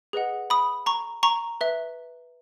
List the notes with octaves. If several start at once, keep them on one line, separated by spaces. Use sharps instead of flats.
G#4 B4 D#5 F#5
B5 D#6
A#5 C#6
A#5 C#6
B4 E5